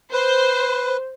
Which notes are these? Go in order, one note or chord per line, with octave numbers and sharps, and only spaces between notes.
B4 C5